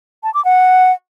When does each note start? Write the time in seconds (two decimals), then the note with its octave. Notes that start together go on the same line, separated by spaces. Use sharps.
0.23 A5
0.34 D6
0.45 F#5